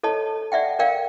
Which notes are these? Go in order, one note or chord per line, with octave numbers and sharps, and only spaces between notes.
A4 C#5 D#5 A5
D5 E5 F#5 G5
A#4 D5 F5 G5